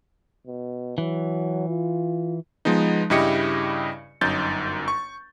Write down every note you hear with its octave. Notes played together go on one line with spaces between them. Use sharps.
B2
E3 F#3
F4
F3 G#3 B3 D#4
G2 C#3 E4 G4 D#5 C#7
G1 F#2 D#4 G6 A6
C#6